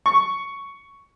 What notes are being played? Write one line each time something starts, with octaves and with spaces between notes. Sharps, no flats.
C#6